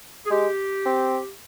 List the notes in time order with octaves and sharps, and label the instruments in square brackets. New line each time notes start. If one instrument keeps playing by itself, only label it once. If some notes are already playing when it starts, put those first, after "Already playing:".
[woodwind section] G#4
[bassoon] G#3 [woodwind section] G4
[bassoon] C4